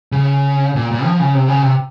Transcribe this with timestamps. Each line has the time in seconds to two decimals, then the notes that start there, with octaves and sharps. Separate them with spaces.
0.12 C#3
0.76 A#2
0.91 A#2
1.05 F3
1.20 C#3
1.34 C3
1.48 C#3
1.62 C3